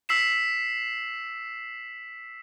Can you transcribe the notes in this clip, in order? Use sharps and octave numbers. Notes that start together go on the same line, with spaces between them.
E6 B6 C7 E7